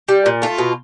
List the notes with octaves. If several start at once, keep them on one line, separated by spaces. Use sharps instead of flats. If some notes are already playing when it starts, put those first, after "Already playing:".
G3
A#2
A3 F4
B2